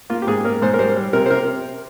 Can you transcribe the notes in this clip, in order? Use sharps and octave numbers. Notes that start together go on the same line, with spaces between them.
A#3 F4
G4
G#2 G#4
A#3 A#4
G#2 C5
A#4
G3 C5
G3
C3 A#4
C5
C3 A#4